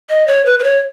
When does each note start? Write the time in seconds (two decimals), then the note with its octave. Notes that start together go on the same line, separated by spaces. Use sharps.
0.10 D#5
0.28 C#5
0.46 B4
0.59 B4
0.64 C#5